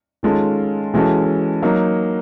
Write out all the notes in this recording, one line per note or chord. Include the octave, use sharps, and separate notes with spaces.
D#3 G#3 C#4 F4 A4
E3 G#3 C#4 F#4 A4
F#3 A#3 D#4